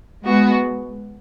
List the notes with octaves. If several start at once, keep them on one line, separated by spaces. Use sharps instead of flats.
G#3 B3 F#4